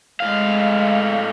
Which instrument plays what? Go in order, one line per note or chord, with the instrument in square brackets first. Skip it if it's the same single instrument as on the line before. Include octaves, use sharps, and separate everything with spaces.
[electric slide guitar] A2 F5 [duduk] G#3